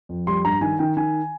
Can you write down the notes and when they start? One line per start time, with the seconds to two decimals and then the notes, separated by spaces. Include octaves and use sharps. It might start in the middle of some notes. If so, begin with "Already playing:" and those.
0.09 F2
0.27 G3 C6
0.45 G2 A#5
0.61 D#3 G#5
0.79 D#3 G5
0.97 D#3 G#5